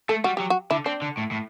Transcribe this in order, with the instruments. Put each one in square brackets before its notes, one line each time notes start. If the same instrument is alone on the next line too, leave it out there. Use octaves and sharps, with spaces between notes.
[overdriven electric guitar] A3 [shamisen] A4
[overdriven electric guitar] G3 [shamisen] F#4
[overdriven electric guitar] F#3 [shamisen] G4
[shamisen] F#4
[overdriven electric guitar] D3 [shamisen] E4
[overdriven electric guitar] C4 [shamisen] D4
[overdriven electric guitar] D3
A2
A2